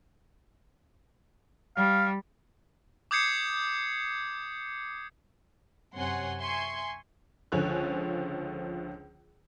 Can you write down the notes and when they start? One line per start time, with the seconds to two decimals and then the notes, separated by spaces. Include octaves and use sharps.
1.76 G3 F5
3.11 D6 D#6 G6 G#6 C7 C#7
5.96 F#2 C3 C#5 F#5 G#5 C6
6.40 E5 G#5 C6 C#6 G#6
7.52 C#2 D3 F3 C#5 G#5 F#6